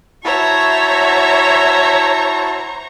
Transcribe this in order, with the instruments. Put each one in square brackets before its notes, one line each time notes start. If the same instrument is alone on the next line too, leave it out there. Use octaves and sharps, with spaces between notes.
[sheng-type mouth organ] E4 F#4 A5 [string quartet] C5 A#5 C#6 [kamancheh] C#5 E5